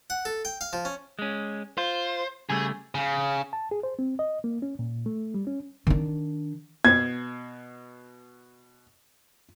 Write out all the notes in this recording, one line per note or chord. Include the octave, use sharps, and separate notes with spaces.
F#5
A4
G5
F5
F3
C#4
G#3 C#4
F4 C5
C#3 G3 A3 G#4
C#3
A5
G#4
C5
C4
D#5
A#3
C#4
A#2
A3
G3
C#4
D#3 D4
B2 G#6